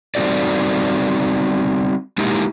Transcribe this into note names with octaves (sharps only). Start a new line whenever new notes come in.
G3 C4 D#4 F#4 A4 D5
G#3 A#3 D#4 E4 G4